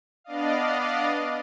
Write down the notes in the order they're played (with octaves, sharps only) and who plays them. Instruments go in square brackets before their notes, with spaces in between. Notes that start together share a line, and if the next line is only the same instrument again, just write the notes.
[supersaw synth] B3 D4 D5 D#5 F5